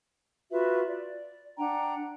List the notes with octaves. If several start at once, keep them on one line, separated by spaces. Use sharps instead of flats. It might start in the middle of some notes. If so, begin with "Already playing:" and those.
F4 F#4 B4 E5
D5
D4 F#5 G5 A#5